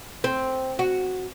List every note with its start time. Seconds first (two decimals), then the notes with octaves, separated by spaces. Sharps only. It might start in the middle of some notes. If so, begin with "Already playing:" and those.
0.24 C4
0.79 F#4